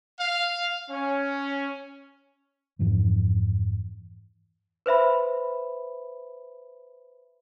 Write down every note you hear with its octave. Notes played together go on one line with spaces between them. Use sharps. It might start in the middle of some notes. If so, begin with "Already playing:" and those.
F5
C#4
F2 G#2 E3 F3
B4 C5 E5 B5